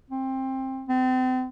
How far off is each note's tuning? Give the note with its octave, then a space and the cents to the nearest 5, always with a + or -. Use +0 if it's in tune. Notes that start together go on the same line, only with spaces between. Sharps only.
C4 +20
C4 -35